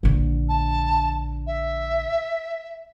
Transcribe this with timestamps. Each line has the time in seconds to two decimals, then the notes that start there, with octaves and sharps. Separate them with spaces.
0.03 A#1 D3
0.49 A5
1.47 E5